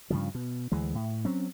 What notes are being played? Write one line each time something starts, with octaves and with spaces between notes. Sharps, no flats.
G2 C#3 F3
B2
D2 E3 G#3
A2
F#3 C4 C#4